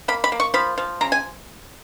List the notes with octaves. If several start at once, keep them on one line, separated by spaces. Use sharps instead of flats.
A#3 B5
B5
A#3
C#6
F3 B5
F3
C#3 A#5
G#5